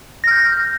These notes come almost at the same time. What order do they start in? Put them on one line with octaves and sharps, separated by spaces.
A#6 F6 G6